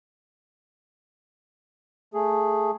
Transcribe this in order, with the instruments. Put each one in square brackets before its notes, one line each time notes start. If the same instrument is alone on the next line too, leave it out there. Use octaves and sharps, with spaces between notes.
[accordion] A3 G#4